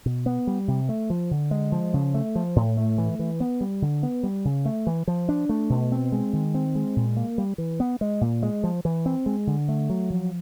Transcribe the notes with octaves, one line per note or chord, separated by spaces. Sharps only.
B2
B3
G3
C3
A3
F3
D3
G#3
F3
C#3
A3
F3
A2
A3
E3
E3
B3
G3
D3
B3
G3
C#3
A3
E3
F3
D4
A3
B2
C4
G#3
D#3
C4
G#3
A#2
A#3
G3
E3
B3
G#3
A#2
G#3
F3
E3
C4
G#3
D3
A3
F#3
F3